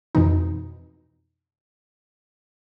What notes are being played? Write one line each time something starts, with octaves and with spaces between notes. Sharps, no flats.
F2 B2 E3 D#4